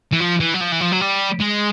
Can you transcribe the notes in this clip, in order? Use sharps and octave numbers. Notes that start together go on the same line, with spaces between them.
E3
F3
E3
F#3
F3
E3
F3
F#3
G3
G#3